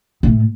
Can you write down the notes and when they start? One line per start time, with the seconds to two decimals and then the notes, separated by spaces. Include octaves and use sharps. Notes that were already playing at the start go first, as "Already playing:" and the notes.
0.23 A2